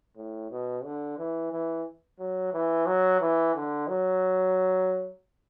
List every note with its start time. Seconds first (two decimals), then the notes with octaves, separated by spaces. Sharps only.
0.16 A2
0.51 B2
0.84 D3
1.18 E3
1.52 E3
2.19 F#3
2.53 E3
2.86 F#3
3.21 E3
3.55 D3
3.88 F#3